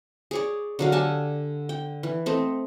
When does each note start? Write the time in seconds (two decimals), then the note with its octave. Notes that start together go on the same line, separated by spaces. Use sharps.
0.31 G#4 C#5 D5
0.79 D3 F#3 F5
0.92 G4 A4 G#5 A5
1.69 G5
2.03 E3
2.26 A3 C4 D#5